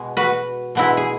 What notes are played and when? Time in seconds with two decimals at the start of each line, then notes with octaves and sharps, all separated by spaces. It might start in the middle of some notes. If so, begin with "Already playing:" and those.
Already playing: B2 G#3
0.17 F#4 B4
0.75 B2 G#3 B3 E4
0.97 G#4